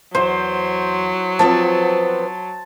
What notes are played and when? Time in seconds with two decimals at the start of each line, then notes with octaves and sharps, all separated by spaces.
0.15 E2 F#3 C5
1.39 F3 B3 C4 A5